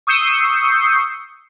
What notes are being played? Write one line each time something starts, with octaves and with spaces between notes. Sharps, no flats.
C#6 D#6 E6 G6 C7 C#7